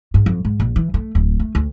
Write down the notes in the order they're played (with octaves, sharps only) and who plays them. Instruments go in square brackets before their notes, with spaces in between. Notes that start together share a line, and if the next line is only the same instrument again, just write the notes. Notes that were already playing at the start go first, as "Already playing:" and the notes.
[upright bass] G#2
F2
G#2
A#1
E3
A3
D1
A3
D2